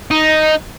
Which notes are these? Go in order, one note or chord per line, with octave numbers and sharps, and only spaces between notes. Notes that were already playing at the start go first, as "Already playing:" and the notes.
D#4